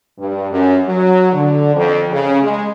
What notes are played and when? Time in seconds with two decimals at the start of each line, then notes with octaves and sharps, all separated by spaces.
0.19 G2
0.51 F#2
0.88 F#3
1.33 D3
1.76 F2
2.12 C#3
2.42 G#3